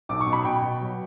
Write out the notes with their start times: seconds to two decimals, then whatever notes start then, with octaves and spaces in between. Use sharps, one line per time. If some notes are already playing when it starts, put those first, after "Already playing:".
0.09 B1 D6
0.21 C#6
0.26 B2
0.33 B5
0.45 B2 G5
0.62 B2
0.81 F#3